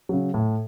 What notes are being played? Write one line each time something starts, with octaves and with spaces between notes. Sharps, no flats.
C#3 F#3
A2